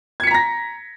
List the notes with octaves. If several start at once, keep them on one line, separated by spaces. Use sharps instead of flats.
A#5 G#6 A#6 B6 C#7